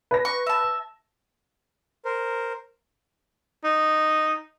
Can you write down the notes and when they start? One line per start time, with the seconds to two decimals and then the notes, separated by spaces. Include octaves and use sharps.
0.11 B4 A#6
0.25 C#6
0.46 E5 A5
2.05 A#4 C5
3.64 D#4